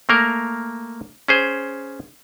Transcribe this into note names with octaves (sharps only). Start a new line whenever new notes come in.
A3 A#3 A#4
C#4 G#4 C5